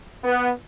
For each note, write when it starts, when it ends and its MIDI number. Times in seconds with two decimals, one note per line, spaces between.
0.23 0.50 59